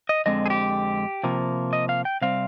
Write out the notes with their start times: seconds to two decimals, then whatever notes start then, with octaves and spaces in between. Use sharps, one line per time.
0.09 D#5
0.26 F2 D3 G#3 C4 D#5
0.46 G#4
0.50 G4
1.23 C3 F3 A#3
1.73 D#5
1.89 F5
2.05 G5
2.21 C3 G3 C4 F5